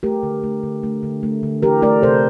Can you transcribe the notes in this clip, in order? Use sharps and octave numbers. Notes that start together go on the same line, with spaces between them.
A3 G4 A#4
D3
A3
D3
A3
D3
A3
D3
E3 G4 A#4
A3 A#4 D5
C3 A4 C5